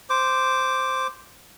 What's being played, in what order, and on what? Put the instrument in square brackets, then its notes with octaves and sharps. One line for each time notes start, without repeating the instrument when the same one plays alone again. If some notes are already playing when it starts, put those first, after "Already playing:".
[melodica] C5 D6